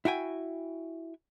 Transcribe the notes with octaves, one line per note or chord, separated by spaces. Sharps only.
E4 F#4 G5 G#5